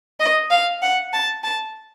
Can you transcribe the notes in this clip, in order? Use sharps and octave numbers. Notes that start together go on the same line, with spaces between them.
D#5
F5
F#5
A5
A5